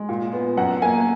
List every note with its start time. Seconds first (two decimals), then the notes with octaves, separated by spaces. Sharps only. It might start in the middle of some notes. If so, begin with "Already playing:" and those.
Already playing: G#3
0.09 A#2
0.33 B3
0.57 F#2 F#5
0.82 A#3 G#5